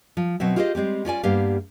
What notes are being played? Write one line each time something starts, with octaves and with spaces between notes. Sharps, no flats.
F3
B2 F#3 C4 E5
F4 G4 G#4 C5 C#5 D#5
G3 G#3 C4 G4
C#4 F4 D5 G#5
G2 A#3 B3 G4 F5